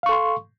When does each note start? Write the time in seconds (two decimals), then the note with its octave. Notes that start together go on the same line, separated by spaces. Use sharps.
0.03 F5
0.06 C#6
0.09 A4
0.12 C6